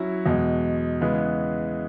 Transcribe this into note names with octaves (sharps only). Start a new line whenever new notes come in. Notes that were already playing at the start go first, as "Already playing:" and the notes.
Already playing: F#3 C#4 E4
E2 B2 G#3
C#3 E3 G#3 B3